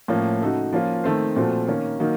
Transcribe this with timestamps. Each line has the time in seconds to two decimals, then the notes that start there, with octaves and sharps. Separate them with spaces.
0.08 A2 F3 A#3 C#4
0.41 C#3 A3 D#4 F#4
0.73 F3 A#3 C#4 F4
1.04 D#3 A3 C4
1.36 A#2 F3 A3 C4 F#4
1.68 D#3 A#3 C#4
2.00 D#3 F#3 A#3 D#4